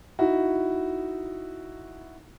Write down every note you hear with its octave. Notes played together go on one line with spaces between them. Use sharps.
D#4 E4 F#4